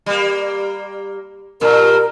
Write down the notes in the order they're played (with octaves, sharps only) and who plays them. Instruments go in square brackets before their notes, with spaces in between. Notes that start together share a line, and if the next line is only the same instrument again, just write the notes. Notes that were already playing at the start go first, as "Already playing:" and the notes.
[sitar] G3 A#3
[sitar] G2 A#2 [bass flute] A#4